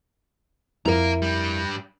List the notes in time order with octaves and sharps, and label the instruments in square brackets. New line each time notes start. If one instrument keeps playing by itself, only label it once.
[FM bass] F2 [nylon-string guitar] E4 A#4 E5 [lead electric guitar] F5 A#5
[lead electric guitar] G2 G3